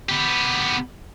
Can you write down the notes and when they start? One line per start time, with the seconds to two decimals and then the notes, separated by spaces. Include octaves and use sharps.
0.09 B3 G4